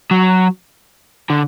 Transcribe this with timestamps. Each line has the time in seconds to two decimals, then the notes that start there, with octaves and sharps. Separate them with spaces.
0.11 F#3
1.30 D3